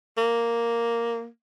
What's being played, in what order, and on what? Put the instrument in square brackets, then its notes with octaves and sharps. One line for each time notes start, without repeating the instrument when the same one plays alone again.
[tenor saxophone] A#3